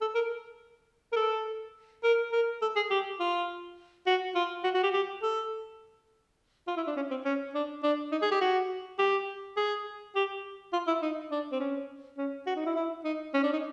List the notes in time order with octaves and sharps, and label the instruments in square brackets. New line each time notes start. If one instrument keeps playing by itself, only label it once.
[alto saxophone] A4
A#4
A#4
A4
A#4
A#4
A4
G#4
G4
F4
F#4
F4
F#4
F#4
G4
G4
A4
F4
E4
D4
C#4
C4
C#4
D4
D4
D#4
G#4
G4
F#4
G4
G#4
G4
F4
E4
D#4
D4
C4
C#4
C#4
F#4
D#4
E4
E4
D#4
C#4
D4
D#4